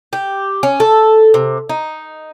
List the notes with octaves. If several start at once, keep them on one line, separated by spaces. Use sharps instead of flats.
G4
C#4
A4
C3
D#4